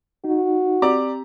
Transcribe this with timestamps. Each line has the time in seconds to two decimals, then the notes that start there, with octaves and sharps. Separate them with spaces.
0.24 D#4 F#4
0.82 C4 G4 D5 A#5 D6